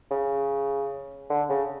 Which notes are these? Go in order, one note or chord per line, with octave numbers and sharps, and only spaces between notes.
C#3
D3
C#3